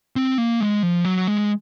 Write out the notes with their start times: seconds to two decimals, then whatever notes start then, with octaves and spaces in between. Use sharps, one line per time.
0.16 C4
0.38 A#3
0.60 G#3
0.83 F3
1.05 F#3
1.27 G#3